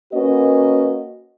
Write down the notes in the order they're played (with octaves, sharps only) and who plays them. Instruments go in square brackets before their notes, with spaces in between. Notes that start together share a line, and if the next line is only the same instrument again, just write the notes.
[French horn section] A#3 C#4 F#4 B4 D#5